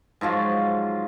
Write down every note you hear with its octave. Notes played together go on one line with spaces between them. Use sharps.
G#2 F3 F#3 F4